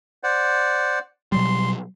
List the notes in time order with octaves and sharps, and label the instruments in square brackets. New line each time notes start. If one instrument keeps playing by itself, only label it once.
[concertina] C5 D5 F#5
[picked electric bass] B2 F#3 G3 [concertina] C6